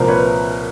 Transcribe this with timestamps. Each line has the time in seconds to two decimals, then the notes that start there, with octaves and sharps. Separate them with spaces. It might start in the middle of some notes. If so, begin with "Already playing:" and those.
Already playing: C2 A#2 F3 A#4 C5
0.08 B4 C#5